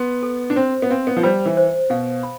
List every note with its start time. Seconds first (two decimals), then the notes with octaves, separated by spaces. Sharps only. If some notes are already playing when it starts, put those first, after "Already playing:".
Already playing: B3 C6
0.23 A4
0.50 D4
0.56 C4 C5
0.82 B3
0.90 C4 F5
1.07 B3
1.17 F3
1.23 G3 C5
1.46 E3
1.57 C5
1.90 B2 F5
2.23 B5